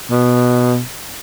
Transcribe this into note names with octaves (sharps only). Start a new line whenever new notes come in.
B2